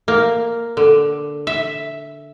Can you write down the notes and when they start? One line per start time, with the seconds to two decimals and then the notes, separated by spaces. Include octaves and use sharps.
0.08 A#3
0.77 D3
1.47 E5